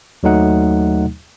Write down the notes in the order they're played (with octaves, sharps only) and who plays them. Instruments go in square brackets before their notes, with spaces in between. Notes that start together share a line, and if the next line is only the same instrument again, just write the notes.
[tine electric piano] D#2 F#3 A3 D#4 F#5